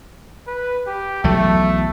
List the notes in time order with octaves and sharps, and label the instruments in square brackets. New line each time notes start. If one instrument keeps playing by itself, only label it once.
[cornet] B4
G4
[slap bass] B1 E2 F#3 [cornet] A3